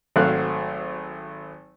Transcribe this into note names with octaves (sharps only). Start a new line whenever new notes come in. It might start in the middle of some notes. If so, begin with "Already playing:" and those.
G#1 F#3 A3 C4 F5 F#6